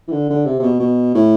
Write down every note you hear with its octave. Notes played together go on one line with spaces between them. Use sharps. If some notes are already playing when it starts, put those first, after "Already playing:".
E3
D3
D3
C3
C3
B2
B2
A2